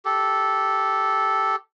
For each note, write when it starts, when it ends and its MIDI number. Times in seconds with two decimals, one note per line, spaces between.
0.05 1.56 67
0.05 1.56 69